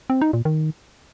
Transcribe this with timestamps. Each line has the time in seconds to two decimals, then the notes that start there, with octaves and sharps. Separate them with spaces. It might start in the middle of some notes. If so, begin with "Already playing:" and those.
0.10 C4
0.21 D#4
0.33 A#2
0.45 D#3